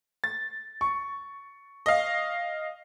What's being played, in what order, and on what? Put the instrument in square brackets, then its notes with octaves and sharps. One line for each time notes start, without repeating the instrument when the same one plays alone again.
[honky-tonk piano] A6
[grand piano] C#6
[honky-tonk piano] D#5 F5